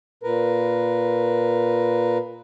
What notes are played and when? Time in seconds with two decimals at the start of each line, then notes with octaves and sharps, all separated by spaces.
0.23 A#2 A#4 B4